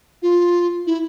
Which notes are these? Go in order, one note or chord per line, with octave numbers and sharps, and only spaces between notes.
F4
E4